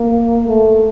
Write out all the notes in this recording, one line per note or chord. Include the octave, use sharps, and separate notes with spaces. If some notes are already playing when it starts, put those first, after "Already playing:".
Already playing: A#3
A3